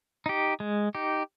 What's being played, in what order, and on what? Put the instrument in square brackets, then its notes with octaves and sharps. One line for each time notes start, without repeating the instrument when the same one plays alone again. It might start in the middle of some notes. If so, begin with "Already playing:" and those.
[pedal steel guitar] D#4 G4
G#3
D#4 G4